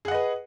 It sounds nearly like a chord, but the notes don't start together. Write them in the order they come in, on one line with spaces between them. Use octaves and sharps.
G#4 F#5 D#5 B4